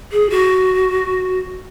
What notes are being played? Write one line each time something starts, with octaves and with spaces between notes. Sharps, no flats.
G#4
F#4